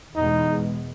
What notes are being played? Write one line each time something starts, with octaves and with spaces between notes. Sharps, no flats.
E2 B2 G#3 D#4